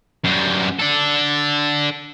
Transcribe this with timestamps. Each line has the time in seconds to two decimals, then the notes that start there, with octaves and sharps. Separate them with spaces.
0.24 F#2 G3
0.79 D4 A4